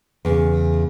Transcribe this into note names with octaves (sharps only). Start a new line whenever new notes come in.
E2 C#3